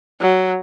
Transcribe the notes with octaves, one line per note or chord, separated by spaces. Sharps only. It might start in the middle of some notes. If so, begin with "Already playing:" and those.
F#3